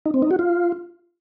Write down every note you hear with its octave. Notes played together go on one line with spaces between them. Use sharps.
D#4
C4
D#4
F#4
F4